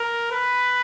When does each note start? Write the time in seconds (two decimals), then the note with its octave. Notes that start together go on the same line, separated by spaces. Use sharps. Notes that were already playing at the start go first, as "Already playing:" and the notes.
Already playing: A#4
0.32 B4